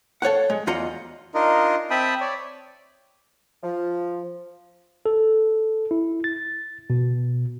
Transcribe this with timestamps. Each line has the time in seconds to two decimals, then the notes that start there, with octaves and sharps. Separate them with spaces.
0.22 A4 C#5 F5 F#5
0.50 G#3
0.67 E2 F4 D#5 F#5 A#5
1.35 D4 D#4 F4 A#4 D#5
1.90 C4 E5 G5 A5 B5 D#6
2.21 C#5 D5
3.64 F3
5.06 A4
5.91 E4
6.24 A6
6.90 B2